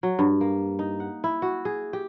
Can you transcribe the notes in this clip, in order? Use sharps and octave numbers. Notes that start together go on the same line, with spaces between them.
F#3
G2
A#3
D#4
F#5
E4
F#4
G#4
G4